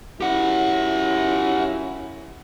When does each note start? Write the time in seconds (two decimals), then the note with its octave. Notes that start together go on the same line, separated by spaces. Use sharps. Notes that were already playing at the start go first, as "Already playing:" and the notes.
0.21 F#2 C#4 E4 G4 F#5